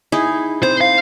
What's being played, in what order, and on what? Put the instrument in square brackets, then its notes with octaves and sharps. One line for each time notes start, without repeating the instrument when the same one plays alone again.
[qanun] D#4 E4 G#4
[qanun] C4 [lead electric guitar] C5
[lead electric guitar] F5